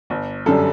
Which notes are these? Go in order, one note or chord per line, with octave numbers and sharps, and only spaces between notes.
G1
F#2 D3 G3 A4